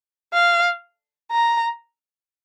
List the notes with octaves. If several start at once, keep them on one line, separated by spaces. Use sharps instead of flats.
F5
A#5